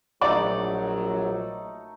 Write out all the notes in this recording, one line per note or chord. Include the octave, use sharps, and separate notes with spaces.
A#1 F#3 A3 D#4 D5 F#5